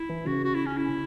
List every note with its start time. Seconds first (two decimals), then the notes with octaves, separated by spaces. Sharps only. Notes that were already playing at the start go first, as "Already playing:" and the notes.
Already playing: E4
0.09 E3
0.26 C#3 F#4
0.44 F#4
0.55 E4
0.66 C#4
0.77 E4